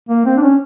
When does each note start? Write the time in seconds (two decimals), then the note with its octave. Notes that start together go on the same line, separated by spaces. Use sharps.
0.09 A#3
0.26 C4
0.37 D4
0.43 C#4